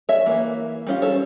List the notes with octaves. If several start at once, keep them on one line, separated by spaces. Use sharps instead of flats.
C#5 E5
E3 A#3
G3 C#4 F4
A4 C#5